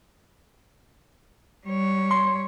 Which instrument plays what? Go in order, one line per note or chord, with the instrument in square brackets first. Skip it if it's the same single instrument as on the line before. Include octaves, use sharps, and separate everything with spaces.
[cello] G3 C#5
[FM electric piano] C6